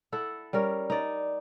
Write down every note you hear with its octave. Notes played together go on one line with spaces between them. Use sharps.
E4 A4 F#5
G3 C#4 A#4
D#4 D5